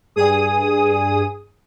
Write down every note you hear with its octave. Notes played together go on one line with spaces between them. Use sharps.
G2 G#4 D#6